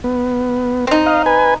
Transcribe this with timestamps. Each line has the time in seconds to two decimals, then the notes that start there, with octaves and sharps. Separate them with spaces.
0.04 B3
0.87 C4 D#4
1.06 D#5 F5
1.26 B4 G#5